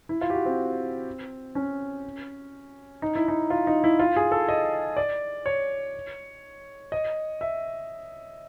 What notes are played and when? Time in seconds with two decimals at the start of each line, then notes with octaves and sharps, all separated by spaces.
0.09 E4
0.21 F4
0.30 G4
0.34 F#4
0.45 C4
1.55 C#4
3.02 D#4
3.15 E4
3.28 D#4
3.50 F4
3.67 D#4
3.84 E4
3.99 F4
4.16 G#4
4.31 A4
4.49 D#5
4.97 D5
5.46 C#5
6.92 D#5
7.41 E5